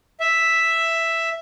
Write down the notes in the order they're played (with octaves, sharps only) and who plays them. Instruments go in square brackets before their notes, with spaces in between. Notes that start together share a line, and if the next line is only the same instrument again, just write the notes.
[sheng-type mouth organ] E5